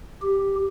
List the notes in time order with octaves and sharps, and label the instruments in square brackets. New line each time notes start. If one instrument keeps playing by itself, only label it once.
[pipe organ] G4